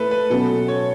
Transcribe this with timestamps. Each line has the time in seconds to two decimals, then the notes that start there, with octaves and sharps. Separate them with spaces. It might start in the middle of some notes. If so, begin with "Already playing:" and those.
Already playing: A3 E4 A4 B4
0.11 B4
0.30 B2 F#3 C#4 F#4 A4
0.68 C#5